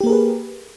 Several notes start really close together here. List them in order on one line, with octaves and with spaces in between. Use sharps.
G4 A#3 A#4 G#4 B4